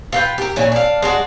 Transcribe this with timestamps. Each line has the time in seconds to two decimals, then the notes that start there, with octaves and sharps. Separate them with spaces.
0.12 F4 B4 G5
0.38 G4 A#4
0.56 A#2 E3 C#4
0.72 D4 F5
1.02 G#3 D4 F#4